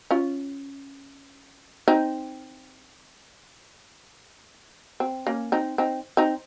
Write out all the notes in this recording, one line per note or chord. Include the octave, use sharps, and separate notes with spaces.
C#4 F4
C4 D#4
C4
A#3 C#4
C4 D#4
C4 D#4
C4 D#4